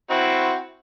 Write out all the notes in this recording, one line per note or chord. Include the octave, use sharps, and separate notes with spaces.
C4 E4 F#4